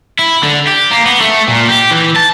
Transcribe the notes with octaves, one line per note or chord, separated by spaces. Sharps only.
E4
D3
G4
A#3
B3
A3
A#2
G4
E3
A5